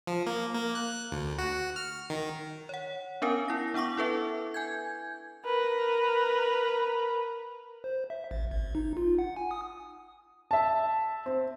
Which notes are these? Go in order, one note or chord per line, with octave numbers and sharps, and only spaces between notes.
F3
A#3
A#3
F#6
D2
F#4
F6
D#3
C#5 F#5
B3 C#4 D4 A#4 F5 G#5
E4 A#6
B3 D4 F#5 C#6 D6
E4 A4 B4 E5
G#5 G6 G#6
A#4 B4
C5
E5
A1
G#1
D#4
F4
F#5
G#5
D#6
E5 A5
C4